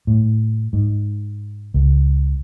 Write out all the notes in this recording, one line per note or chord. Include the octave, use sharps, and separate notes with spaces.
A2
G#2
C#2